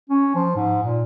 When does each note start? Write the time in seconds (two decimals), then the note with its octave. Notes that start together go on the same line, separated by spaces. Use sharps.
0.09 C#4
0.35 F3
0.55 G#2
0.83 A#2